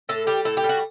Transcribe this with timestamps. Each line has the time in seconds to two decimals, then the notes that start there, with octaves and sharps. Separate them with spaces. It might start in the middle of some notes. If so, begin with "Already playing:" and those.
0.09 A2 A4
0.27 G3 G4
0.45 A2 A4
0.57 G4
0.64 G3
0.69 F#4